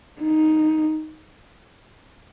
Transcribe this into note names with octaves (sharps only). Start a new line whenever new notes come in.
D#4